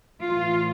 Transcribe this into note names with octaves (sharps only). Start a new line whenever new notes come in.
A2 E3 F4